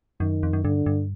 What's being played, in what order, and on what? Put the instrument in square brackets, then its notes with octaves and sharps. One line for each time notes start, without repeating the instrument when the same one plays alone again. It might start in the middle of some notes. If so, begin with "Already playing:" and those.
[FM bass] F#2 [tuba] D#3
[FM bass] F2
F#2
[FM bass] G2 [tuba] D3
[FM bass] G2